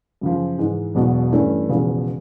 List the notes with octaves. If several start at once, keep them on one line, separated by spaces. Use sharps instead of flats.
F#2 C#3 F3
G#2 E3 G#3
E1 E2 B2 F#3
G2 E3 A3 C#4 E4
E1 E2 C#3 F3